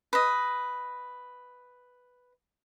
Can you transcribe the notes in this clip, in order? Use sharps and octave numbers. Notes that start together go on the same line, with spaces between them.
B4 D#5